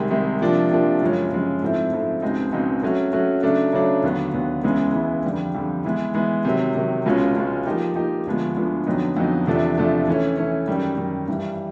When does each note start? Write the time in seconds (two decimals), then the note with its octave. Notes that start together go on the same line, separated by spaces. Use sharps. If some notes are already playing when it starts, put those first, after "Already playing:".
Already playing: C2 C3 D#3 G#3
0.10 C2 C3 D#3 G#3
0.41 C3 F3 A#3 D4
0.71 C3 F3 A#3 D4
1.01 F#2 C#3 F3 G#3 C#4
1.31 F#2 C#3 F3 G#3 C#4
1.62 G#2 F3 A3 C4 E4
1.92 G#2 F3 A3 C4 E4
2.22 C#2 B2 G#3 C4 D#4
2.53 C#2 B2 G#3 C4 D#4
2.83 F#3 A3 C#4 F#4
3.13 F#3 A3 C#4 F#4
3.43 C#3 F#3 A3 D4
3.73 C#3 F#3 A3 D4
4.03 D#2 D3 F#3 B3
4.34 D#2 D3 F#3 B3
4.63 C#2 C#3 E3 G#3 B3
4.94 C#2 C#3 E3 G#3 B3
5.24 F2 D3 G3
5.55 F2 D3 G3
5.85 E3 G#3 B3
6.14 E3 G#3 B3
6.45 C3 D#3 F#3
6.75 C3 D#3 F#3
7.06 C#2 B2 G#3 C#4 F4
7.35 C#2 B2 G#3 C#4 F4
7.66 F3 A#3 D#4 G4
7.96 F3 A#3 D#4 G4
8.27 D2 D3 F3 G#3 B3
8.57 D2 D3 F3 G#3 B3
8.87 F2 D3 F#3 B3 D#4
9.17 F2 D3 F#3 B3 D#4
9.47 E2 C3 F3 A3 D4
9.77 E2 C3 F3 A3 D4
10.08 E3 A3 C#4
10.37 E3 A3 C#4
10.68 F#2 D#3 G3
10.98 F#2 D#3 G3
11.28 G2 E3 G3